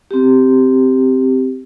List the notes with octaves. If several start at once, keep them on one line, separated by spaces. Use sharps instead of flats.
C4 G4